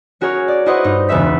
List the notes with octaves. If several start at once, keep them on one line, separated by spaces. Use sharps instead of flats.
C#4 F#4 G#4 A#4 C#5
D5
E4 F#4 B4 C5 D#5 F#5
G2 D#4
E1 C#2 B4 E5 B6